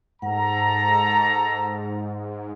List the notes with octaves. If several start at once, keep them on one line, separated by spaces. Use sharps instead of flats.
G#2 A4 F#5 A#5